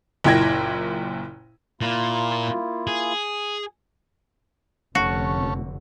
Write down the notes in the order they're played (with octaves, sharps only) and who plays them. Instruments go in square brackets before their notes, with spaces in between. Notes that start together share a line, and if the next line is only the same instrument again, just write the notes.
[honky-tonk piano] F#1 A#2 E4 G5 G#6 A#6
[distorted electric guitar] A#2 [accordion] A#3 E4 F4
[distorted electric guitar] G#4
[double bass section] F1 D3 [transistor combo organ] A3 C#4 [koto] F#4